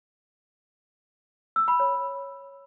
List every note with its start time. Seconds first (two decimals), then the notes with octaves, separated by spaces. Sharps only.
1.56 E6
1.68 B5
1.80 C#5